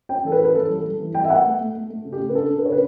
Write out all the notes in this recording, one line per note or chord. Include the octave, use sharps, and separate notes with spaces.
C#4 G5
E3 A4
B4
C#4
B4
E3 A4
G3
A4
G3
E3
G3 G5
E5
B3 F#5
A3
A3
A3
A3
C#3
G4
C#3
B4
D4 A4
D4
B4
C#3 C#5
B4